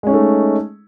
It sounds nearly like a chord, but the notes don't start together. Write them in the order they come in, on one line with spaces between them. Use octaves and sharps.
G#3 C#4 D#4 A3